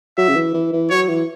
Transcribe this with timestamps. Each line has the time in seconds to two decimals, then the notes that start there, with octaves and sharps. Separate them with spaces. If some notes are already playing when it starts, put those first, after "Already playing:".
0.17 F#3 E5
0.29 C#3
0.35 E3
0.54 E3
0.73 E3
0.90 F#3 C#5
1.09 E3